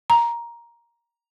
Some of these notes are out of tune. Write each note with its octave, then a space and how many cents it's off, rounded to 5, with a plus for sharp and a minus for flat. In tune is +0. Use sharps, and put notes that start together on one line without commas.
A#5 +10